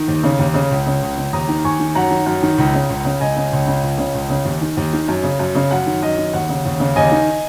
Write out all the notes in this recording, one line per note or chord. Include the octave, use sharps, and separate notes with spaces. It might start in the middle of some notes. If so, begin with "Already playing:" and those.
Already playing: D#3
D#2
C#3
D#2
C#3
C#2
C#3
C#2
C#3
D#2 A#5 D#6
D#3
D#2 G#5 C#6
D#3
F#2 F#5 A#5
D#3
F#2
D#3
C#2
C#3
C#2
C#3
C#2 D#5 G#5
C#3
C#2
C#3
C#2
C#3
C#2
C#3
D#2
D#3
D#2
D#3
F#2
C#3
F#2
C#3
F#2 F#5
D#3
F#2 D#5
D#3
D#2 F#5
C#3
D#2
C#3
D#2 D#5 G#5
D#3